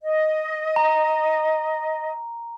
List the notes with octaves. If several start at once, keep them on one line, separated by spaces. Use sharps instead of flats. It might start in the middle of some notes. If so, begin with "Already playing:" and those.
D#5
A#5